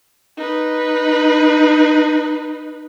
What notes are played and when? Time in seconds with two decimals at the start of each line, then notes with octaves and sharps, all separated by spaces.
0.37 D#4 B4